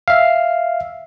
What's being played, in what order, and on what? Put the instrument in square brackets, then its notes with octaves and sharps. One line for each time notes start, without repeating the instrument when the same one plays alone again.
[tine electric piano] E5 F5